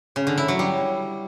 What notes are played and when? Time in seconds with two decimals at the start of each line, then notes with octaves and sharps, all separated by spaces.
0.16 C#3
0.27 D3
0.38 E4
0.48 F#3
0.59 G3